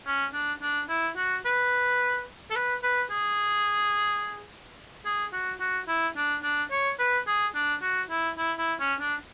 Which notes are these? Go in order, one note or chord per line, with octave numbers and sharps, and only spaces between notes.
C#4
D4
D4
E4
F#4
B4
A4
B4
B4
G#4
G#4
F#4
F#4
E4
D4
D4
C#5
B4
G#4
D4
F#4
E4
E4
E4
C#4
D4